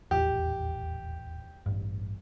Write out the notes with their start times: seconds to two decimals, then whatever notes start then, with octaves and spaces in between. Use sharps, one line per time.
0.11 D#1 A1 E2 G4
1.66 A1 G2